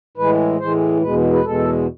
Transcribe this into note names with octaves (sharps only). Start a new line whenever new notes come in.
A2 E3 G#3 B4
A2 E3 G#3 C5
E2 B2 G#3 B4
B4
E2 B2 G#3 A4